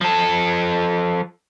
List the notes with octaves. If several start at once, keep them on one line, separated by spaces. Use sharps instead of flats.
F3 A4